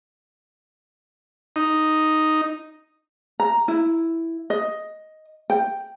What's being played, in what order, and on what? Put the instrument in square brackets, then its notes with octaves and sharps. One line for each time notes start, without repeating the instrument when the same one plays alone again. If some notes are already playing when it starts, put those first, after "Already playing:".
[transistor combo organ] D#4
[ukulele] A#5
E4
D#5
G5